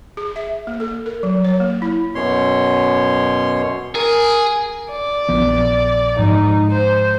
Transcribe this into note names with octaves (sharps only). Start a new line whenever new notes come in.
G#4
E5
A#3
A4
A#4
F#3
C#5
A#3
E4
F#2 B2 C#5 C6
G#4 A#4
D5
A#1 F3 B3
G#2 F3 D#4
C5